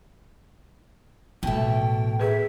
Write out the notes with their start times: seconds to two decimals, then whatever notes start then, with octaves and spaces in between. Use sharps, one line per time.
1.43 A1 B2 A3 G5
2.20 G#4 B4 E5